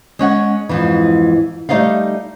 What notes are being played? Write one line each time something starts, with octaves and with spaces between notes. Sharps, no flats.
G#3 C#4 F#5
F2 G#2 E3
G3 A3 D#4 D5 D#5 F5